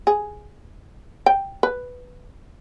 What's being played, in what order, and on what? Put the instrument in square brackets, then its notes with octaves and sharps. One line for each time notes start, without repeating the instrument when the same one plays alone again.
[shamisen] G#4
G5
B4